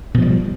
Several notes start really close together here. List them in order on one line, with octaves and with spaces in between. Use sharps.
B2 F3 G#3 G3